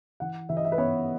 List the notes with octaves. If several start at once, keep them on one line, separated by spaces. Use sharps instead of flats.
E3 F#5
E3 E5
D#5
E5
B4
B3 C#5